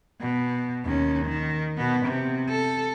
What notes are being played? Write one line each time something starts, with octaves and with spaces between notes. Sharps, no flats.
B2
D#2 C#4
D#3
B2 B3
C3
A4